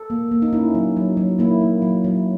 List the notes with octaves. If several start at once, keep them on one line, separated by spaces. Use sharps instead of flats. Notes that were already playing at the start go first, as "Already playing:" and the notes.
Already playing: A4
A#3
A#3
D#4
C#4 E4
F#3
F#3
F#3
A#3 E4
A#3
F#3
F#3